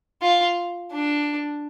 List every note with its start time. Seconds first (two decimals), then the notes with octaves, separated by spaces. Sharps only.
0.22 F4
0.93 D4